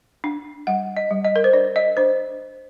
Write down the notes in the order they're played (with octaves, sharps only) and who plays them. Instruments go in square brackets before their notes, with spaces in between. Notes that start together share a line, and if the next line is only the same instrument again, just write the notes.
[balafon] D4
G3 F#5
D#5
G3
D#5
A#4
C5
D4 D5
D#5
D4 C5